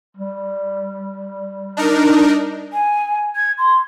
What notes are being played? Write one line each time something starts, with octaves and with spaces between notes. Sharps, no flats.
G3
D4 D#4 A#4
G#5
G#6
C6